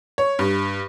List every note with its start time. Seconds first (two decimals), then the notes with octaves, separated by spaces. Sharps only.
0.18 C#5
0.39 G2